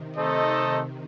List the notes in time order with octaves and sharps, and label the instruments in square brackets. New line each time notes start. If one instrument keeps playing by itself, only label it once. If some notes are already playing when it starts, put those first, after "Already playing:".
Already playing: [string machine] C3 D#3
[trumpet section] A3 D#4 A4 C5 D#5